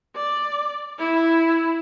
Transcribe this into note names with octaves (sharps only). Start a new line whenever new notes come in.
D5
E4